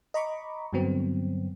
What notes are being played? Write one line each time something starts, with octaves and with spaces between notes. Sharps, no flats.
D#5 A#5 B5 C#6 D6
G2 D3 F#3 B3 C4